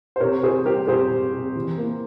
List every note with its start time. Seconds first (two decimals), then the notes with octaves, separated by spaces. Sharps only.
0.16 C5
0.20 C3 A#4 C#5
0.43 C3 G#4 C5
0.65 G3 G4 A#4
0.88 C3 G#4 C5
1.10 C3
1.33 C3
1.55 E3
1.77 A#3